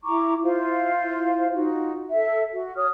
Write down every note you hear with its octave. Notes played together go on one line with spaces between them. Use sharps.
E4 A#5 C#6 D6
E4 F4 C5 F5
D#4 F4 F#4
A4 E5
F#4
C#5 D#6 F6